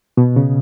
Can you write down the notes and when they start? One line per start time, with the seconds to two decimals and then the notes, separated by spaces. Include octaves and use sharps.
0.17 B2
0.36 C#3